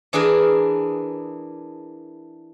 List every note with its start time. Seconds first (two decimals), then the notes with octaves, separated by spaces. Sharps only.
0.13 E3 D4 G#4 A#4 B4